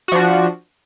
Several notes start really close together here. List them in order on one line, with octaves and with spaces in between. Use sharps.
F#4 F3 D4